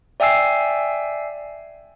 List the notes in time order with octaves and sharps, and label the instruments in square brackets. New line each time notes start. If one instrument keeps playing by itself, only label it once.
[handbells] D5 E5 G5 G#5 E6 C7